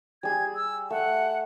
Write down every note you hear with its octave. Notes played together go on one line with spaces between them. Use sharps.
G3 G#4 G#6
E6
A3 F#5